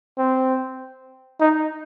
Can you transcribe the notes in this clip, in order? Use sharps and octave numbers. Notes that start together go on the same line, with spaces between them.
C4
D#4